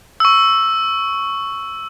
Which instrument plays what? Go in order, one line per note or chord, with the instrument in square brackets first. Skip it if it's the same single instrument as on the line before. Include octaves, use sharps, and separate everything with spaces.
[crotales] C#6 E6